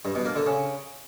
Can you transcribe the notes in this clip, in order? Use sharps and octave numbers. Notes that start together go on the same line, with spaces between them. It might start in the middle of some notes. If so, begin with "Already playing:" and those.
G2
B2
A#3
D3
C#3